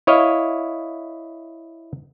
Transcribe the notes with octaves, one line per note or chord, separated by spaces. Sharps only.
E4 C#5 D#5 F5